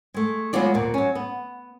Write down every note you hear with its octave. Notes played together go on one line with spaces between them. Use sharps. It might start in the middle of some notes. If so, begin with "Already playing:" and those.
G#3 A3
F#3 G#3 B3 C#4 F4 D5
D2 A#2
F#3 C#4
B3